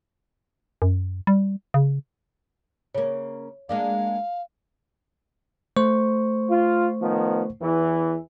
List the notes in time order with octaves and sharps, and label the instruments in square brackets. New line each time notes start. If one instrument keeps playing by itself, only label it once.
[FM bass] F#2
G3
C#3
[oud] C#3 A#3 [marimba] C#5
[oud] G#3 A#3 D4 [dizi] F5
[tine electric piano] A3 C5 C#6
[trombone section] F4
D#3 F3 B3
E2 E3